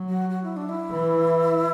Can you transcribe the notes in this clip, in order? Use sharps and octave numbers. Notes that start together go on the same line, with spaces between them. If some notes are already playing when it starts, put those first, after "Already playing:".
Already playing: F#3
F#4
F#4
E4
D4
E4
E3